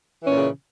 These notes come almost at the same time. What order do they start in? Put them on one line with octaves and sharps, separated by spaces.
E3 C#4 A#2 C#3